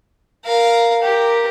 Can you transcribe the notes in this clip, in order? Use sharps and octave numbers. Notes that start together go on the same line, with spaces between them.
A#4 F5
G4 A#4